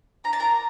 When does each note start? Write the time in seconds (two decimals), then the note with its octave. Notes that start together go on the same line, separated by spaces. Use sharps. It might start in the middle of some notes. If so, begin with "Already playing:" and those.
0.24 D4 A#5
0.33 A5
0.40 A#4 A#5